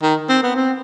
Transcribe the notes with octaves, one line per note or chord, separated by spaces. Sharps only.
D#3
C4
B3
C4